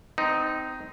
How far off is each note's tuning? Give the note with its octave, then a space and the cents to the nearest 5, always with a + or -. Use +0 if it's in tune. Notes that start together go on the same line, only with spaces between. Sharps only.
C4 -25 D#4 +0